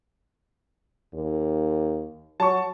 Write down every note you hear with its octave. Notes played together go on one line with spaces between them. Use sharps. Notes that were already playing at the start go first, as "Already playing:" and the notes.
D#2
F#3 A5 C#6